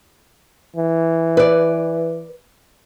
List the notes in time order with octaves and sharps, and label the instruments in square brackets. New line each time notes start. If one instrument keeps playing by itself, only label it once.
[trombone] E3
[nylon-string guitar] B4 D5